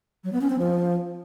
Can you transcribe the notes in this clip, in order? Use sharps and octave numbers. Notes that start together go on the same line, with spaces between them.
F#3
B3
C#4
C4
F3